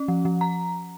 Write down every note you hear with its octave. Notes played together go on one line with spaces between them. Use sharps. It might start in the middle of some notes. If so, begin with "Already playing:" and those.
Already playing: C#4
F3
F3
A#5